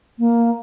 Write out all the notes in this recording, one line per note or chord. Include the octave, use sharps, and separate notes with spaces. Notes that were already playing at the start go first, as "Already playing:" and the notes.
A#3